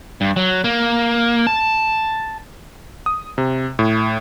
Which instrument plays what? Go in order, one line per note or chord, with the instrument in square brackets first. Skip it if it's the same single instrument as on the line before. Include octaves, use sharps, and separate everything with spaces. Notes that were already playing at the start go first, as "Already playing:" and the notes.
[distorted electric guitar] G2
F#3
A#3
A5
[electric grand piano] D#6
C3
A2